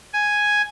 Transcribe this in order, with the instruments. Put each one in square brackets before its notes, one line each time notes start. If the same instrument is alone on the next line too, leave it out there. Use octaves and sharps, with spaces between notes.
[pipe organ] G#5